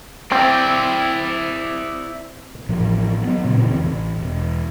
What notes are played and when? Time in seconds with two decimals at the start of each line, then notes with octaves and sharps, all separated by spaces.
0.32 C4 E4 D5
2.69 A1 A2 F3
3.24 F#3 B3
3.44 A#2 C#3 C4
3.62 F1 C#3 E3 C4
3.83 A1
4.18 E1